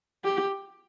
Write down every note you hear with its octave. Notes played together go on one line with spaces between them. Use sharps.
G4